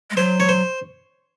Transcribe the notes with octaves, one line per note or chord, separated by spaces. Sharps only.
G#3
F#3 C5
C#5
C5